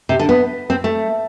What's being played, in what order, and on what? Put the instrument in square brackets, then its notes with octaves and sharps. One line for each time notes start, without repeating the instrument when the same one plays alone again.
[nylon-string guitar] C3
D3
B3
C4
A3